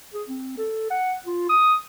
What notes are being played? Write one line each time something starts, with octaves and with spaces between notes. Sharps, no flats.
G#4
C4
A4
F#5
F4
D#6